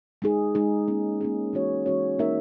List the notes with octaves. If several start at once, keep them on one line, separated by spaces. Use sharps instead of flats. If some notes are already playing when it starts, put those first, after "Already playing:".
G#3 D#4 G#4
G#3 D#4 G#4
A#3 C#4 G#4
A#3 C#4 G#4
E3 G#3 C#4 F#4 C#5
E3 G#3 C#4 F#4 C#5
A#3 D#4 A#4 E5